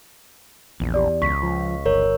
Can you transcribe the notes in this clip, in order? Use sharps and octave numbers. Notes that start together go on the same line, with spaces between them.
A#1 E2
G4 D5
C#2 C#6 B6
F3
G1 A#4 C#5